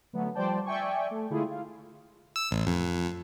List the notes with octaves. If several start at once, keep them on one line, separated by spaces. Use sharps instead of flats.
D3 F#3 A3 B3
F3 G3 C5 D5 G5 A5
D5 E5 G5 G#5 C#6
A3
D3 G#3 A3 E4 F4 G#4
F4
E6
A1
F2